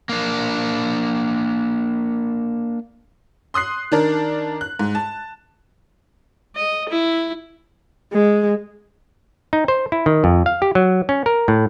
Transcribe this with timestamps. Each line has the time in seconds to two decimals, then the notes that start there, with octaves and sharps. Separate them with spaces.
0.09 A#3 D4
3.54 C6 D#6 F#6 C7
3.92 D#3 D4 A#4
4.61 F#6
4.79 G#2
4.95 A5
6.56 D#5
6.89 E4
8.13 G#3
9.53 D#4
9.68 C5
9.92 E4
10.06 D#3
10.24 F2
10.46 F5
10.62 G4
10.75 F#3
11.09 C#4
11.26 A#4
11.48 A2